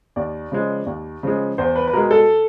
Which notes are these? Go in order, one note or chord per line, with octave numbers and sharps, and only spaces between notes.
D#2 D5
C#3 F3 G#3
D#2
C#3 F3 G#3
E2 C5
B4
B4
B2 G#3 A#4
A4